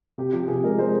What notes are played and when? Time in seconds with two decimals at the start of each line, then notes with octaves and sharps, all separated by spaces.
0.18 C3 G4
0.33 F3 G4
0.48 C3 G#4
0.64 G#3 A#4
0.78 G#3 C5